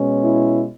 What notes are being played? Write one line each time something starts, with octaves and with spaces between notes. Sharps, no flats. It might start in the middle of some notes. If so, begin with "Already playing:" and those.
Already playing: B2 G#3 C#4
E4